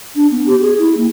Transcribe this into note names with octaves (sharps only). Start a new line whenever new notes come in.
D4
B3
G4
G#4
E4
A#3